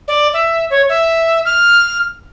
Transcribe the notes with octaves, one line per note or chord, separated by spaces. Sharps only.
D5
E5
C#5
E5
F6